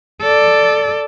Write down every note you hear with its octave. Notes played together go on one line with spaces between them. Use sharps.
A4 D5